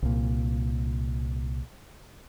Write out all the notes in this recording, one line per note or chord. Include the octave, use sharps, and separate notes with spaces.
C2 A#2